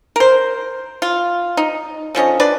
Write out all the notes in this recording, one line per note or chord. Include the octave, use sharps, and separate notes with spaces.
A#4 C5
F4
D#4
D3 F3 C#4 D#5
D4 B4 D5